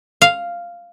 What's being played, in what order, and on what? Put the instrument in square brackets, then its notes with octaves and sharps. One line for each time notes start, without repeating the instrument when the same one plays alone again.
[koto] F5